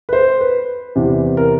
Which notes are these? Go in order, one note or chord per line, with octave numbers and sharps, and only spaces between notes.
B4
C5
B4
E2 C3 E3
A#4